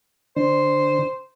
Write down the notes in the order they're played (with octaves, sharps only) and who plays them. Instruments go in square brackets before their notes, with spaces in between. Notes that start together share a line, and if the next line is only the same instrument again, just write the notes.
[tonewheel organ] D3 D4 [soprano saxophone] C5